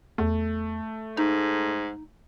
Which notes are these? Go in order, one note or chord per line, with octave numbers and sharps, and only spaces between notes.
E2 A3
G#2 D#4